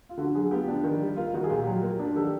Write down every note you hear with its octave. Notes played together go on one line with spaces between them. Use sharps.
F4
D3 F#4
F#3 F#4 G#4
B3 F4 G4
D4
D#3
G3
A#3 F4
D#3 F#4
G#4
A#2 F4 G4
F#3
A#3
D4
D#3 G4 A4